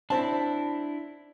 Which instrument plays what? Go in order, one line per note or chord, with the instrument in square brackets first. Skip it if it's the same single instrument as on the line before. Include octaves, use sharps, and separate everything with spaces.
[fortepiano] C4 A5 [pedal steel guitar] D4 E4